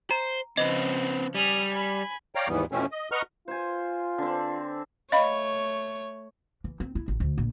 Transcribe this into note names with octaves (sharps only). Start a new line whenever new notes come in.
C5 A#5
C#3 F3 C4 B4 D#5
G3 G#5 D#6 F6
G#5 B5
C#5 D5 F5 G5 A#5
D#2 G#2 E3 G3 B3
F2 B2 E3 A3 C4 C#4
D#5
B4 D#5 F#5 A#5 C#6 F6
F4 C5 G#5
D3 C4
A3 C#5 D#5 F5 B5
E3
C4
E4
A1
D2
A#1